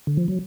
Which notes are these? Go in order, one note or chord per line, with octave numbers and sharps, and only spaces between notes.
D3
F3
F#3